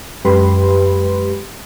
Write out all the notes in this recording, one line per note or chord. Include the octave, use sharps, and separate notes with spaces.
F#2 G#3 G4 B4 B5 C6